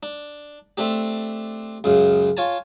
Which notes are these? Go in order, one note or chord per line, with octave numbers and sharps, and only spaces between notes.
D4
A3 C4 D4 G4
C#2 F#2 C#3
F4 C#5 G#5 A5